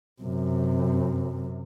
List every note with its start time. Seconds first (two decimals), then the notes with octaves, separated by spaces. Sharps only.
0.22 F#2 C3